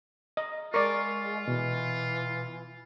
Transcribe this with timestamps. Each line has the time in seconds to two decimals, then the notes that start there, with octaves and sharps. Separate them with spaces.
0.37 D#5
0.74 G#3 F4 A#4 D5 C#6
1.48 B2 E3